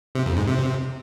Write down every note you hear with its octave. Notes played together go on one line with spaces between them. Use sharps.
C3
F2
G#2
C3